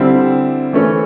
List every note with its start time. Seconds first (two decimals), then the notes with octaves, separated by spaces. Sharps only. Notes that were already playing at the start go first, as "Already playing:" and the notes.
Already playing: D3 G3 C4 E4
0.73 E3 A3 C#4